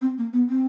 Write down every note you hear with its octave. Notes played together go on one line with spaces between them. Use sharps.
C4
A#3
B3
C4